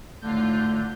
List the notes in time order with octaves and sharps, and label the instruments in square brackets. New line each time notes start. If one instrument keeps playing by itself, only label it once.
[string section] G#1 A2 F4 [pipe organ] D3 G6 [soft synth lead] A3